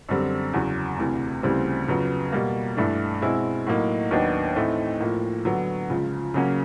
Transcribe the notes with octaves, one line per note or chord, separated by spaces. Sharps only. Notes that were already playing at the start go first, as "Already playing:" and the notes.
F#2 D3 G3 C4
E2 C#3 F#3
D2 C3 E3
D2 C#3 E3 G3 C4
F2 C#3 F#3 B3
B2 G3 A#3
G2 E3 A3 D4
B2 G#3 C4 E4
A2 F#3 A#3 D#4
D#2 D#3 F#3 B3 D4
A2 E3 A3 C4 D#4
A2 F3 A#3
D3 F#3 B3
C#2 C#3 F3
C#3 F#3 A#3 C#4